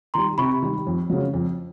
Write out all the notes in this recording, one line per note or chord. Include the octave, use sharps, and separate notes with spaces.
D#3 G3 A#5 C6
C3 B5 C#6
D#3 G3
F2
C#3 F#3
F2